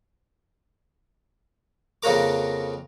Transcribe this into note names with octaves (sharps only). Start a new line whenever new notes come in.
F2 C#3 A#3 F#4 A#4 D6